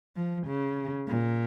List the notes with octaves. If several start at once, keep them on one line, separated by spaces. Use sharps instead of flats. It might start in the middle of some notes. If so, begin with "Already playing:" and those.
F3
C#3
A#2